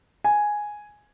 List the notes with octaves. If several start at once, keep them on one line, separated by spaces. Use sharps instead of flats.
G#5